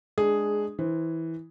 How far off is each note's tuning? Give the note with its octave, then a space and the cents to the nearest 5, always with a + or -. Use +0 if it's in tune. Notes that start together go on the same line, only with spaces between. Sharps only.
G#3 +15 D4 +15 G#4 +0
E3 -15 C5 +0